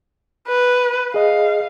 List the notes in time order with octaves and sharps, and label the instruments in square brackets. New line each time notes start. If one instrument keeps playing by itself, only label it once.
[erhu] B4
[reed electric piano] G#4 D#5 [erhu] F5